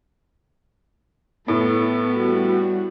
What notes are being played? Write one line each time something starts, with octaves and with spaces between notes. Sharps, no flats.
A2 B3 A4
G3 F#4